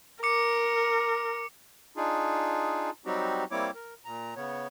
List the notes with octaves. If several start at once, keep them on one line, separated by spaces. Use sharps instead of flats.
A#4 D6 C#7
D4 D#4 F4 G#4
F#3 G3 C4 D#4 F#4 G4
G3 A#3 C4 E4 C#5 D6
A#4
A#2 A#5
C#3 B3 C#5